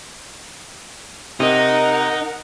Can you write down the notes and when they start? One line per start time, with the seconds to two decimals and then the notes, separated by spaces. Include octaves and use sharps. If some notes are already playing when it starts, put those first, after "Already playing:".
1.40 C3 D#4 A#4 D#5 F#5